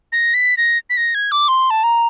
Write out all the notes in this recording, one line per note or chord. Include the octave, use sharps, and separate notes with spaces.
A#6
B6
A#6
B6
A#6
G#6
D6
C6
A5
A#5